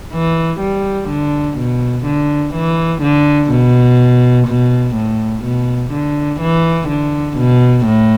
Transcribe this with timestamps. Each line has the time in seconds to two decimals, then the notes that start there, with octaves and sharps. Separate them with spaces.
0.13 E3
0.60 G3
1.09 D3
1.58 B2
2.05 D3
2.54 E3
3.02 D3
3.51 B2
4.48 B2
4.96 A2
5.45 B2
5.93 D3
6.41 E3
6.89 D3
7.38 B2
7.86 A2